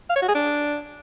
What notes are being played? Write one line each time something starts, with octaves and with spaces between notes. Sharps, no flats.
F5
C#5
F#4
G#4
D4